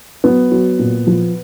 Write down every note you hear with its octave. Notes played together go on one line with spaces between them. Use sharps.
F#3 B3
F#3
A#2
F3